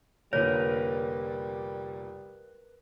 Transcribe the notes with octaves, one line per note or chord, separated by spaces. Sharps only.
F1 A#2 D3 G3 A#4 B4 C#5